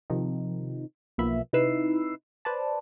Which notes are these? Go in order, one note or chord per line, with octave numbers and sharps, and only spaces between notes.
C3 D#3 F3 D#4
B1 F3 A#3 B3 E5 B5
C3 D#4 E4 B4 E6 C7
B4 C5 D5 A5